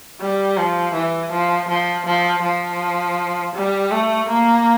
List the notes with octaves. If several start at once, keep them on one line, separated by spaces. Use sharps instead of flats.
G3
F3
E3
F3
F3
F3
F3
G3
A3
A#3